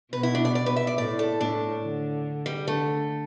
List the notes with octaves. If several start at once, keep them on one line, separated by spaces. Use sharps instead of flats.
B2 B4
E4
D4
D5
D5
B4
E5
D5
A2 D5
A4
A2 D4
D3
G3
D3 A3